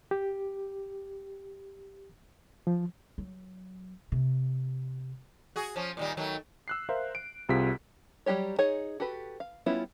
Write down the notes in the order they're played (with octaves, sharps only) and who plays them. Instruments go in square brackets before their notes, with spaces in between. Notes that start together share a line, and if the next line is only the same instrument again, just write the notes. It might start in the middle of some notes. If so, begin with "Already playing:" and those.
[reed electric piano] G4
F3
[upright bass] F#3
C3
[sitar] F#4 G#4
F3 C#4
A#2 D#3 G3
D#3 F#3 A3
[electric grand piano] E6 F#6 C7
A#4 C5 E5 F5
D7
C2 C3 F4 G#4 B6
[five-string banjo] F#3 G3 A#3 G4 C#5
D#4 G#4 C#5
F#4 G4 A4 B4
F5
G3 B3 C#4 E4 F4